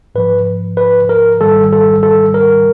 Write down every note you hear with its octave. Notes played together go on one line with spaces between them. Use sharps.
G#2 F3 B4
B4
A#4
G#2 D#3 G3 A4
A4
A4
A#4